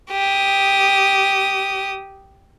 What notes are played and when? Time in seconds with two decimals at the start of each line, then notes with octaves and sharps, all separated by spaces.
0.11 G4 D#6